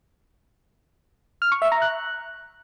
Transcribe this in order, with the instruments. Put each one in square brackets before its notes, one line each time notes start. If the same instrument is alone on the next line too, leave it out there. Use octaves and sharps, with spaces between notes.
[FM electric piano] F6
C#6
E5
A#5
F#6